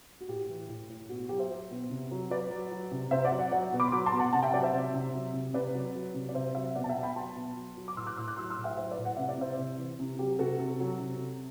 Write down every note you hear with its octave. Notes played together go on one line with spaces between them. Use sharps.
F#4
A2 G4
E3
A2
A2
B2 F#4
F#4
F#3 G4
C5 E5
F#3
B2
C3
F#3
F#3 B4 D5
F#3
F#3
C3
C3 C5 E5
D5 F#5
F#3
D5 F#5
F#3 D5 F#5
B2
B5 D6
C6
F#3 B5 D6
A5 C6
B2
F#5 A5
C3 F#5 A5
E5 G5
F#3 D5 F#5
C5 E5
C3
C3
F#3
C3
C3 B4 D5
F#3
F#3
C3
D5
C3 C5 E5
F#3 C5 E5
E5
B2 D5 F#5
A5
E5 G5
B2
G5 B5
F#3 A5 C6
B2
F#3
F#3
D6
A2 C6 E6
D6 F#6
A2 C6 E6
D6 F#6
F#3 C6 E6
C6 E6
A2
E5 G5
F#3 C5 E5
B4 D5
A2
F#5
C3 E5
D5
C3 C5 E5
C3
E3
C3
F#3 G4
C3 F#4 A4
C3
F#3
C3